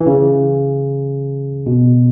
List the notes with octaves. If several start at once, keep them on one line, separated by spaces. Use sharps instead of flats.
E3
C#3
B2